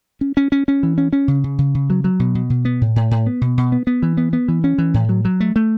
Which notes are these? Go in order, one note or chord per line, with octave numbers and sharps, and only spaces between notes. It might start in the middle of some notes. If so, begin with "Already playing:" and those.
C#4
C#4
C#4
C#4
E3
C#4
C#4
C#3
C#3
C#3
C#3
F#3
F#3
B2
B2
B2
B3
A2
A2
A2
B3
B2
B2
B3
B3
E3
B3
B3
E3
C#4
E3
A2
F#3
F#3
A3
A3